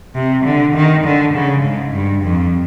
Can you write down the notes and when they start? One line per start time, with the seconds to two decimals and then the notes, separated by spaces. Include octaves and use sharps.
0.14 C3
0.45 D3
0.75 D#3
1.04 D3
1.34 C#3
1.64 G#2
1.94 G2
2.24 F2